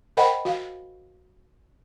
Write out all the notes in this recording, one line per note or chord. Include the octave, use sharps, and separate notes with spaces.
A#4 C5 D#5 F#5 G5 B5
F#4 F5